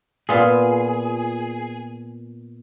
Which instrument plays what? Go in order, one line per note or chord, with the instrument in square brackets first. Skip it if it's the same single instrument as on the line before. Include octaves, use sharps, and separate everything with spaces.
[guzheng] A#2 B3 F4 [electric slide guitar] G#4